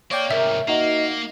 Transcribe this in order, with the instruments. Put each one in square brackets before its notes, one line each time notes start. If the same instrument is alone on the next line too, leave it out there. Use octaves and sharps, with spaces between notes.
[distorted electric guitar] A#3 [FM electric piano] C#5 D5 G5
[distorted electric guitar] C2 G#2 [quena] A#4 [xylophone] E5
[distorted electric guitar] A#3 [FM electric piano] D#4 F#4 [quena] D#5